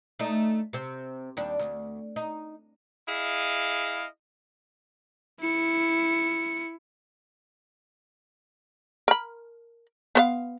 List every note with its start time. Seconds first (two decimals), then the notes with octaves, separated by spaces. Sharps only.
0.19 A3 D4 D#4
0.73 C3 C4
1.37 D#2 G3 D4
1.59 D2
2.16 D#4
3.08 E4 G#4 D#5 F5
5.40 E4 C#7
9.08 A#4 B5
10.15 B3 C5 F5